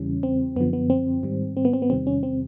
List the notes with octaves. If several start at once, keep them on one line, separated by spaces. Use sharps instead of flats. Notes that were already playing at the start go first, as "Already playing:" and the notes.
Already playing: E2 C#3 E3 G3 C#4
C4
F#2 D3 F3 B3
B3
C4
G#2 D#3 G3
C4
B3
C4
B3
E2 C3 D#3 G3 C4
C#4
C4